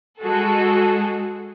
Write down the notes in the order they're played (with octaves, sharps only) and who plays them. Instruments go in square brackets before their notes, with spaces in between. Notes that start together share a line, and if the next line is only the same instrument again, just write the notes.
[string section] G#3 F#4 G#4 A4